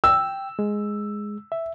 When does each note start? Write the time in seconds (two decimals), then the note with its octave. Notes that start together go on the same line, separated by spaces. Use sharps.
0.04 G5 E6
0.59 G#3
1.52 E5